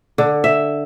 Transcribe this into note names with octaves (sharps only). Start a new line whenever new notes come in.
D3
E5